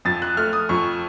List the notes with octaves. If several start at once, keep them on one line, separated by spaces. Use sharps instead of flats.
F2 A6
F#6
A3 F6
D#6
F2 C#6